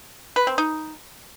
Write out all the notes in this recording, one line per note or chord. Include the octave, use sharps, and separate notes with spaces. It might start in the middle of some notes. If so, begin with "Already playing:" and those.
B4
C4
D#4